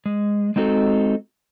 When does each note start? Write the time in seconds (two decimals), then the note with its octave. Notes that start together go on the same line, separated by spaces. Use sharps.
0.06 G#3
0.56 G#3 C4 D#4 F#4 A4